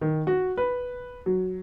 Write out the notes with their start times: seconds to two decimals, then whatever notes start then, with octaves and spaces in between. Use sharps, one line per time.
0.01 D#3
0.27 F#4
0.57 B4
1.26 F#3